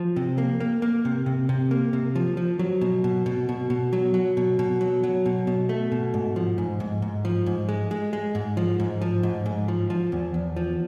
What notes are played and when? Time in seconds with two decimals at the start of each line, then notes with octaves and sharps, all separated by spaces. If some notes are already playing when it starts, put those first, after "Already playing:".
Already playing: F3
0.16 C3
0.38 A#3
0.60 A#3
0.82 A#3
1.05 C3
1.26 C3
1.49 C3
1.71 A#3
1.93 C3
2.15 F3
2.37 F3
2.59 F#3
2.81 B2
3.04 B2
3.26 B2
3.49 B2
3.70 B2
3.93 F#3
4.14 F#3
4.37 B2
4.59 B2
4.81 F#3
5.03 F#3
5.26 B2
5.47 B2
5.69 A3
5.92 B2
6.14 G#2
6.36 F3
6.58 G#2
6.80 G#2
7.02 G#2
7.25 F3
7.46 G#2
7.69 G#3
7.91 G#3
8.13 G#3
8.35 G#2
8.57 F3
8.80 G#2
9.01 F3
9.23 G#2
9.46 G#2
9.68 F3
9.90 F3
10.12 E2
10.34 E2
10.57 F3